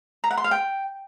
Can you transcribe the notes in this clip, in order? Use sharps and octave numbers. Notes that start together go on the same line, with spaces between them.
A#5
F#5
C6
F5
G5